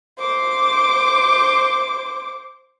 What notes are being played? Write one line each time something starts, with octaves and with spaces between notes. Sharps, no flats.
C5 D6